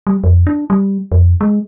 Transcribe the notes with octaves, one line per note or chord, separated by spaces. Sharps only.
G3
F2
D4
G3
F2
G#3